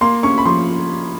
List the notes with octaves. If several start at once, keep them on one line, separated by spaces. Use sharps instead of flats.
A#3 C6
C#4 C#6
B5
F3 C6